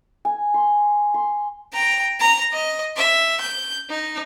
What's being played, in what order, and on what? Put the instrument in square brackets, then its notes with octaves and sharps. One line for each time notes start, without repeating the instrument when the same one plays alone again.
[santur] G#5
C6
C6
[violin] G5 A#5
A#5
D#5
E5
G6
D#4